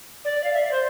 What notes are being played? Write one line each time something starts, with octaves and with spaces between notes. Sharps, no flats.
D5
F5
E5
D5
C5